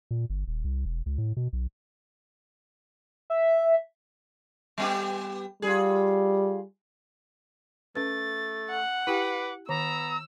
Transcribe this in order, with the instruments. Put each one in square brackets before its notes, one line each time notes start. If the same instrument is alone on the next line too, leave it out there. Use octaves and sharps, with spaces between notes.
[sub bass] A#2
G1
D#1
C2
E1
C#2
A2
B2
B1
[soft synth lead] E5
[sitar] G3 B3 G4
[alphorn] G3 [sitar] F4 G#4
[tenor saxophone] A3 [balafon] C#4 B4 [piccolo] A6
[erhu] F#5
[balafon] E4 G4 G5 [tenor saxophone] B4 [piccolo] D6
[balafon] D#3 [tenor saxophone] B3 [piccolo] A#5 [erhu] E6